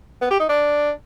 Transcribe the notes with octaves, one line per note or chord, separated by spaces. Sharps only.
B3
G4
D#4
D4